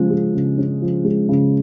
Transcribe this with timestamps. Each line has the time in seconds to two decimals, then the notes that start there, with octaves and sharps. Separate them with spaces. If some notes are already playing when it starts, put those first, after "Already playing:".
Already playing: C#3 F3 G#3 C#4
0.10 G#3
0.34 C#3
0.58 C#4
0.82 F3
1.04 G#3
1.29 C#3